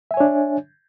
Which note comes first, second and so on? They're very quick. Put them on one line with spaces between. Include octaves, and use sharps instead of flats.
E5 G#5 C#5 D4